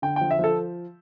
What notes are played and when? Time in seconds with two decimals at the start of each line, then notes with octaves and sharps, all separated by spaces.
0.02 D3 G5
0.16 F3 G5
0.31 E5
0.39 F3 A4